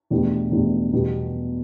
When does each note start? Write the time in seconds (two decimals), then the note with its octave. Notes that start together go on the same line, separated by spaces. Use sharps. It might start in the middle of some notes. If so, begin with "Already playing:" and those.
0.10 E2 B2 A3 D4 G4
0.51 E2 B2 A3 D4 G4
0.93 E2 B2 G3 B3 G4